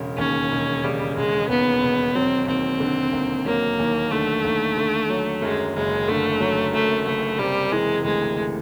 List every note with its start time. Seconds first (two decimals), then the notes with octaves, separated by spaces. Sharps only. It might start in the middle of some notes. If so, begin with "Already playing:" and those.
Already playing: E1 C#3
0.18 D#2 C#4
0.51 E1
0.84 C#3 G3
1.16 E1 G#3
1.49 D#2 B3
1.82 E1
2.15 F#3 C4
2.47 D#2 C4
2.80 D3
3.13 D#2
3.46 F#3 A#3
3.79 D#2
4.11 D3 A3
4.44 D#2
4.77 D3
5.10 F#3
5.42 F#2 G#3
5.75 F#1 G#3
6.08 D3 A3
6.40 F#3
6.73 F#2 A3
7.06 F#1 A3
7.39 C3 G3
7.72 E3 G#3
8.05 D2 G#3